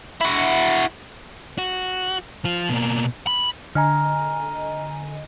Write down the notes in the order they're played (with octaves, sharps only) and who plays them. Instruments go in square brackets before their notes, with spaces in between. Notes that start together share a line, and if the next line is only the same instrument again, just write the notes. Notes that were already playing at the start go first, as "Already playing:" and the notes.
[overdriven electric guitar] E4 F#4
[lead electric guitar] F#4
F3 F4
B2 A#3
B5
[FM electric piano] D3 D#5 G#5 [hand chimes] A#5 F6